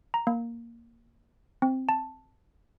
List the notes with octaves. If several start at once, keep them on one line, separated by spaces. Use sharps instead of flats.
A#5
A#3
C4
A5